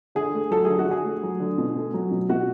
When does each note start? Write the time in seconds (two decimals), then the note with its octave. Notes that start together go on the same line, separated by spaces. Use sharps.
0.15 D3 G#4
0.34 A3
0.51 F#3 A4
0.65 D3 G#4
0.79 F#4
0.87 D3 G#4
1.04 A3
1.23 F#3
1.40 D3
1.58 B2
1.76 A3
1.94 F#3
2.11 B2
2.29 B2 F#4